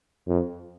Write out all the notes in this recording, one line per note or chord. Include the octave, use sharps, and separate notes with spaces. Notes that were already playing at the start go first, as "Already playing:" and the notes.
F2